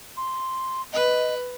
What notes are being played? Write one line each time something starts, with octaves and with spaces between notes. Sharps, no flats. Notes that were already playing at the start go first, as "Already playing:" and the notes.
C6
B4 D#5